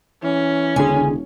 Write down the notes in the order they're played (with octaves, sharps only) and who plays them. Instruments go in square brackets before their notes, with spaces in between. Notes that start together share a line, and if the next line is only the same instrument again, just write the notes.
[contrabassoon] E3 [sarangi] C#4
[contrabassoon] E1 [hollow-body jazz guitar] C#2 D3 G#4 [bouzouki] G#5